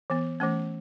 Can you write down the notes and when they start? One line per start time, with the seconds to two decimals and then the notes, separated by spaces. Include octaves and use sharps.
0.10 E3 B3
0.40 E3 A3 C#4